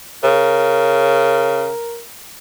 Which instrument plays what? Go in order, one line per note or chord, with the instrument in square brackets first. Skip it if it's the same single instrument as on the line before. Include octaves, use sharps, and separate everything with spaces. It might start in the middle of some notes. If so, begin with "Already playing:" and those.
[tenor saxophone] C#3 [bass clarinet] A#4